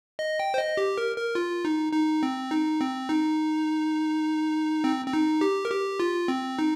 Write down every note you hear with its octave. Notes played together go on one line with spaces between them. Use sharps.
D#5
G5
C5
D#5
G4
A#4
A#4
F4
D#4
D#4
C4
D#4
C4
D#4
C4
C4
D#4
G4
A#4
G4
F4
C4
D#4